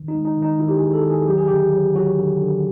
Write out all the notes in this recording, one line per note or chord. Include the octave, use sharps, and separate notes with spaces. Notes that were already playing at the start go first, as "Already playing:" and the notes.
Already playing: D#3
D#4
G#3
D#4
D#3
D#4
D#3 E4
G4
G#4
D#3
A4
D#3
G#4
F#3 G4
G#4
D3 G4
F#3
F#3 F#4
D3
D3